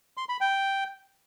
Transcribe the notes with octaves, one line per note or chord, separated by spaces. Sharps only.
C6
B5
G5